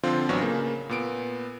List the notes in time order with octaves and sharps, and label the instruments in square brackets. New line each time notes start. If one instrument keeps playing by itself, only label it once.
[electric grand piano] D3 F3 C4 F4
A1 F#3 B3 D4 C#6
C#3 A#3
A#2 B3 D7